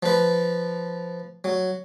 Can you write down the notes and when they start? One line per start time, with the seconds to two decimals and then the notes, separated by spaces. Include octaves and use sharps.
0.03 F3 B4
1.44 F#3